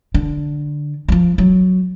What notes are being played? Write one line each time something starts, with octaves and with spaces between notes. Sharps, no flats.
D3
F3 F#3
F#3